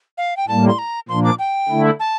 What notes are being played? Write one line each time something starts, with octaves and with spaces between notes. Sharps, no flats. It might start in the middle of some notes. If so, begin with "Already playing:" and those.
F5
G5
A2 G3 A#3 A5
C6
A#5
A#2 F3 A#3 D4 C6
D6
G5
D3 A3 E4
A5